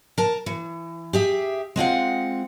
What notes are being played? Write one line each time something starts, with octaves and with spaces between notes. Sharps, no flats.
A#4 A5
E3
G4 G#4 E5
G#3 C4 F4 F#5